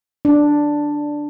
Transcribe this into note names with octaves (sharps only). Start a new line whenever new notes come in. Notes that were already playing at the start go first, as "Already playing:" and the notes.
D4